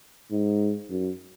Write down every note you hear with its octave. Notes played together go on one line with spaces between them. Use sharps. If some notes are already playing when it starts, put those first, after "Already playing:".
G#2
F#2